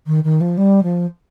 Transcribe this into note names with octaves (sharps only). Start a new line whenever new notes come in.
D#3
D#3
F3
G3
F3